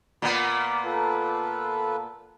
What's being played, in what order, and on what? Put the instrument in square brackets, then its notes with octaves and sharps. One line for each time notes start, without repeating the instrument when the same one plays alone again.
[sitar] A#2 A#3 B3
[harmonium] F4 A4 B4